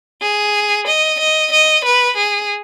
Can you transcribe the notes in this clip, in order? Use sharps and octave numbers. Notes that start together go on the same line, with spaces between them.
G#4
D#5
D#5
D#5
B4
G#4